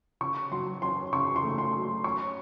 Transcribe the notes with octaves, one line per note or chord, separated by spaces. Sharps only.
C#3 C#6
F#3 C6
C#4 C6
C#3 C#6
C6
A3
C6
F#3
C#4 C#6